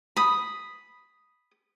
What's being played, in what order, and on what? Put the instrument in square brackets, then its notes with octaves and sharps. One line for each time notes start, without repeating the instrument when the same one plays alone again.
[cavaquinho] B5 D#6